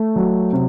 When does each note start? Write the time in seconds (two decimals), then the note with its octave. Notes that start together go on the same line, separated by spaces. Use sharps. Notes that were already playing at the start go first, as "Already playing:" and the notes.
Already playing: A3
0.16 F#3
0.53 C3